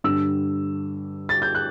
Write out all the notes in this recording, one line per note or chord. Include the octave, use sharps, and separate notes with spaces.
G2 D3 E6
A6
G6
F#6